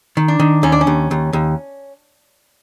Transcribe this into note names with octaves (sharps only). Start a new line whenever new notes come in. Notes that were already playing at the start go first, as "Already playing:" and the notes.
D#3
D4
D#3
D#2 C#4
D4
C#4
D#2
D#2
D#2